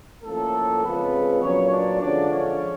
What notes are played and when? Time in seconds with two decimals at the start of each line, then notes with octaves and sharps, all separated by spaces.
0.24 A2 F3 A3 A#3 C#4 A4
0.84 C#3 F3 G#3 B3 C4 B4
1.41 A#2 F#3 B3 C#4 C#5
1.71 D4 D5
2.00 D3 F3 G#3 C#4 D4 D5
2.30 C#4 C#5